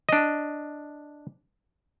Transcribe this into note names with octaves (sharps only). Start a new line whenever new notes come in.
D4 D#5